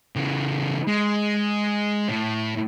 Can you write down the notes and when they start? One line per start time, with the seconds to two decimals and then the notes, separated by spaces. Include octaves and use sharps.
0.16 C#3 E3
0.88 G#3
2.09 A2